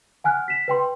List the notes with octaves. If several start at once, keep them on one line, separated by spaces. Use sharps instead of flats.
F#5 G#5 F6 F#6
B6 E7
B4 G5 C6